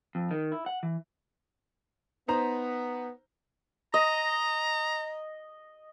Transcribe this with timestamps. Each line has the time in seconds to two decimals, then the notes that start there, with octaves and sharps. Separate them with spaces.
0.15 F2
0.31 D#3
0.52 E4
0.66 F#5
0.83 E3
2.28 B3 D#4 C5 A#5
3.94 D#5 A#5